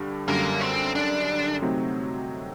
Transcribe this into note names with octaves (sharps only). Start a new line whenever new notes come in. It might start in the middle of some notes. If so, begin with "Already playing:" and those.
Already playing: G2 D3 G3 D4
F#2 D3 G3 A#3
C4
D4
C3 F#3 A3 C4 D#4